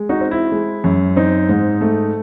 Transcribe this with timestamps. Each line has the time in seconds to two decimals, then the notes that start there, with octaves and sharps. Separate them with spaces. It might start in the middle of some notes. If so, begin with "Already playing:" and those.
Already playing: G#3
0.09 D#4 F#4
0.21 C4
0.31 E4
0.52 G#3
0.84 F#2
1.16 C4 D#4
1.49 G#2
1.81 A3